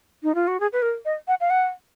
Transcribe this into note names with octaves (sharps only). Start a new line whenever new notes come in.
D#4
F4
F#4
G#4
B4
A#4
D#5
F#5
F5
F#5